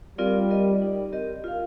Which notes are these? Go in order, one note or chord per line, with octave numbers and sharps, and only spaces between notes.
G3 C4 F4 A#4 D5 F5
F4 A#4 D#5
D#4 A#4 D5
C4 G4 A#4 D#5
F4 A#4 F5